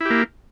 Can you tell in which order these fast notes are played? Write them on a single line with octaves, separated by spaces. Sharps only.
E4 G4 A#3